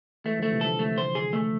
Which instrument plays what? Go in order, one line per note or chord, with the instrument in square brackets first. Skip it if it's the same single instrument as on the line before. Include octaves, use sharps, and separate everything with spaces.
[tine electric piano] E3 G#3 [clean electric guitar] A3
[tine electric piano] D3 F3 [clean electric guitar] A3
[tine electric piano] C3 E3
[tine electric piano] D3 F3 [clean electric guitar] A4
[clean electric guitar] A3
C5
G#4
A3